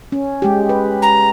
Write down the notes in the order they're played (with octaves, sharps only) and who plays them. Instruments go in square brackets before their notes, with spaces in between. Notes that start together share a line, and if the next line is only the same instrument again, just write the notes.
[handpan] C#4
G#3 G4
B4
[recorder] A#5